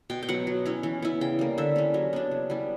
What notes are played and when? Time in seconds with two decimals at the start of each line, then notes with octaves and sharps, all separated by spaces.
0.10 B2 G5
0.23 G5
0.29 F#3 B3 F#5
0.47 F#3
0.66 C#4 E4
0.83 E3
1.02 B3 E4
1.21 C#3 G5
1.39 G3 A#3
1.58 D3 E5
1.76 G3 C#4
1.94 F#3
2.13 B3 D4
2.31 C#3
2.50 G3 B3 E4